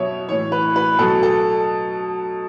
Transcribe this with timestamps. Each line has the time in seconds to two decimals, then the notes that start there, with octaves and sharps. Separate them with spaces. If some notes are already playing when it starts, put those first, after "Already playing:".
Already playing: B2 F#3 C#5 E5
0.29 A2 E3 C#5
0.52 B4
0.76 B4
0.99 B2 F#3 A4
1.23 A4